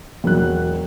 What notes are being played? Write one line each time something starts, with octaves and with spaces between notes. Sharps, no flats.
E1 F#3 F#6